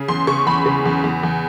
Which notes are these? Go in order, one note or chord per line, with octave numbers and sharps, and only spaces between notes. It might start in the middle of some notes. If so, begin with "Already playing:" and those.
Already playing: C#3
E2 C6
C#3 C#6
E2 B5
C#3
E2
E2
E2